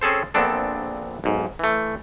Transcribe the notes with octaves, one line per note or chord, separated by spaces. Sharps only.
C4 C#4 G#4 A4 C5
A#1 A#2 B3 C4 D4 A4
B1 G#2
E3 A3